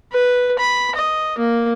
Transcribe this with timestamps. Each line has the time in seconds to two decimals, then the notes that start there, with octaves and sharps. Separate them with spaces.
0.13 B4
0.59 B5
0.96 D#5
1.38 A#3